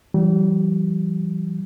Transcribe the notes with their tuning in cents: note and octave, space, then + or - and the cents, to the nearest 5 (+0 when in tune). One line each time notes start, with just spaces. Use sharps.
E3 +20 G3 -35